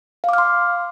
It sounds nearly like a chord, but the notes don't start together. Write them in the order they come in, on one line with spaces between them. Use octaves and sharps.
F5 D6 F6 C6